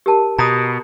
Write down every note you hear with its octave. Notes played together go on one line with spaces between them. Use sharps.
G4 A#4 A5
B2 A#5 B5 D#6